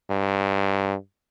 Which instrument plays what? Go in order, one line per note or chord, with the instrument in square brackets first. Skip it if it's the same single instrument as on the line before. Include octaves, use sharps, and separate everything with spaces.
[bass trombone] G2